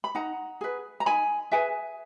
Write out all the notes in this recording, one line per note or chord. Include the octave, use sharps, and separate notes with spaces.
B5
D#4 F#5 A#5
G#4 B4
A#5
D#4 G#5 B5
G#4 B4 E5 G#5